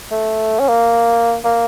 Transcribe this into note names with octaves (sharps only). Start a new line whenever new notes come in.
A3
C#4
A#3
A#3